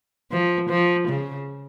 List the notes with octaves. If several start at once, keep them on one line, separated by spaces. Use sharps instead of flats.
F3
F3
C#3